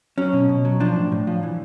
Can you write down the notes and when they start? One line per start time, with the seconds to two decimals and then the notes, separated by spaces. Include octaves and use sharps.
0.18 F#3 C#4
0.33 B2
0.49 B2
0.65 F#3
0.80 F3 D4
0.96 A2
1.12 A2
1.27 F3
1.43 E3